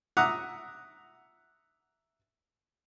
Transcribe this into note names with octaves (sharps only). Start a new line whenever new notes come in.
E5 F#5 A#5 D6 D#6 F#6